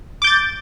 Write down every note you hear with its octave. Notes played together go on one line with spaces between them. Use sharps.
D6 G6 A6